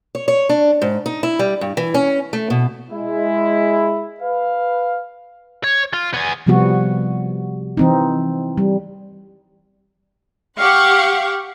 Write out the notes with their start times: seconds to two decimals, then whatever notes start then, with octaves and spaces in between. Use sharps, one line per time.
0.15 C#5
0.28 C#5
0.49 D4
0.82 G#2
1.06 D#4
1.23 E4
1.39 G3
1.61 G2
1.77 E3
1.94 C#4
2.33 A3
2.50 B2
2.91 G#3 E4
4.21 B4 F5
5.64 C#5
5.94 F4
6.14 B3 G#5
6.47 C3 F3 G3 B3 F#4
7.77 E3 C4 D#4
8.58 G3
10.58 G4 F5 F#5 C#6